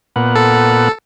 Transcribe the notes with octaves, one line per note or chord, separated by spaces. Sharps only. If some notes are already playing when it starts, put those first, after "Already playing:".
A#2 B3 F#5
A4